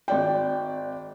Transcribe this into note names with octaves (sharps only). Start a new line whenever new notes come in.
G#1 D5 G5